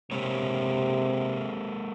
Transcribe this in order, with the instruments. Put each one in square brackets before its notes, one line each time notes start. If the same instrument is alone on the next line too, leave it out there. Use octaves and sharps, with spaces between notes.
[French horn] C3 [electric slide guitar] G#3 A#3 C#5